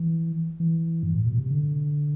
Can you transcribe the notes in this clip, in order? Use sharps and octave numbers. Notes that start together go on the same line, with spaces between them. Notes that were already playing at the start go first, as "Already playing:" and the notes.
Already playing: E3
E3
G2
A2
B2
C3
D3